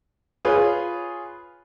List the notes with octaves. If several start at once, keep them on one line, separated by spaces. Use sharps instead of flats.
F4 G#4 B4 C#5